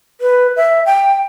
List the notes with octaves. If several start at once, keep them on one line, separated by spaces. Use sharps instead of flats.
B4
E5
G5